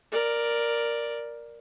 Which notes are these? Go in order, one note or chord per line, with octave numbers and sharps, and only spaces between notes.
A#4 D5